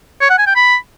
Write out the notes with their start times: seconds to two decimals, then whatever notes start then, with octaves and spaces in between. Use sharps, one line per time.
0.21 C#5
0.30 F#5
0.38 G#5
0.47 G5
0.56 B5